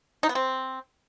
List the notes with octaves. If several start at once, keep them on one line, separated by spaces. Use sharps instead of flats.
D#4
B3
C4